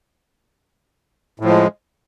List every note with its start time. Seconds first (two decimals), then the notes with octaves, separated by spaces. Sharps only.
1.40 A2
1.44 F3
1.49 G#3